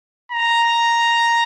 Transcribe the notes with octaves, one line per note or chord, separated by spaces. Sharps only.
A#5